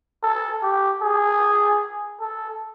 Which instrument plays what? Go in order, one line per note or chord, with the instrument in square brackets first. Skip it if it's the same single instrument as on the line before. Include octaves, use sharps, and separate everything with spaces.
[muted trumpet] A4
G4
G#4
A4